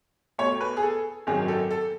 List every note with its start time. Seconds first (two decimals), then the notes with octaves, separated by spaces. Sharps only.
0.39 E2 B2 A3 C#5
0.61 B4
0.77 G#4
0.82 A4
1.27 G#1 F#2 D#3 F#3 G#4
1.48 A4
1.71 A4